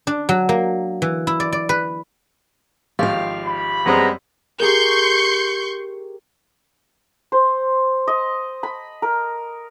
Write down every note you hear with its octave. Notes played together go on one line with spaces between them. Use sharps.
D4
F#3
A#3
E3
E4
D5
D5
B4
G#1 F3 F4 G4 F5
B5
F#2 G3 G#3 B3 C4 A#5
G4 G#4 A#4 C6 C#6 G6
C5
D#5
B5
A#4